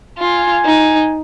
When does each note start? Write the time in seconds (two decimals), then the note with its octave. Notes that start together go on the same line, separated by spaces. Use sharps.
0.18 F4 G#5
0.65 D#4